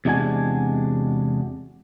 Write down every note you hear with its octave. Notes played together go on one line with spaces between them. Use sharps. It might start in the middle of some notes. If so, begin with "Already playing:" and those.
E2 C3 G#3 D4 F#4 G#5